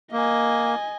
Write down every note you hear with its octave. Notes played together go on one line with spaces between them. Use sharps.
A#3 D#5 G#5